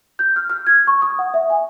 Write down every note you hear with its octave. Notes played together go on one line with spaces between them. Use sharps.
G6
F6
F6
G#6
C#6
D#6
F#5
E5
G#5